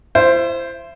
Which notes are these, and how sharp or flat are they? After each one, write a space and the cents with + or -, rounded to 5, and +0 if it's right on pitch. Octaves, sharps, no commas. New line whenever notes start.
E4 +35 C5 +0